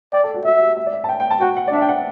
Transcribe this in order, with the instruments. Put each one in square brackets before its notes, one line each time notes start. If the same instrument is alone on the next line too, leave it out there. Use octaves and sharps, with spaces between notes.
[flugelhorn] D5 [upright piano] G5
[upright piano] A4
F#4
[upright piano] F#4 [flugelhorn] E5
[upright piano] G4
E5
D5
E5
A5
G5
G5
A5
[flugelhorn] F#4 [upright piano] G5
[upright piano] F#5
D5
[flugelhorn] D4 [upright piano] E5
[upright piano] G5
F#5